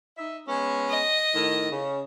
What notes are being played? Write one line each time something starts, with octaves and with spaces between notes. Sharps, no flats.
D#4 E5
G#3 B3 C#4
D#5
A2 D#3
C#3